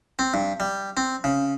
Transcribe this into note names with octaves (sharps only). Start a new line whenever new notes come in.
C4
G2
G3
C4
C#3